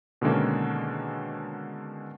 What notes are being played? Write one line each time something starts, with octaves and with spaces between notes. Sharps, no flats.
B2 D3 D#3 G#3 A#3 C#4